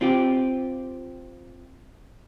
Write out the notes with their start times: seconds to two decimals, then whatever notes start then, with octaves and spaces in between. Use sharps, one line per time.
0.01 C4 F4 G4